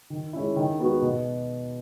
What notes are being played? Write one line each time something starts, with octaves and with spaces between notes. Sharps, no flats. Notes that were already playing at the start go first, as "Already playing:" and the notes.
D#3
G#3 C#4 E4
D#3
G#3 B3 F#4
B2